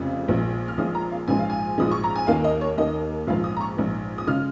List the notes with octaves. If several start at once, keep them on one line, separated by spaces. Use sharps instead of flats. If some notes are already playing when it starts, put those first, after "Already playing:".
Already playing: F1 F2 C#3
A#1 A#2 F3 G#3
F6
A#1 A#2 F3 G#3 D#6
A#5
F5
A#1 G#2 F3 G#3 G#5
F5
G#5
A#1 G#2 F3 G#3 D#6
C#6
A#5
G#5
D#2 D#3 A#3 F5
D#5
C#5
D#2 D#3 A#3 D#5
A#1 G#2 F3 F5
D#6
A#5
C#6
A#1 G#2 F3
D#6
C#3 G#3 F6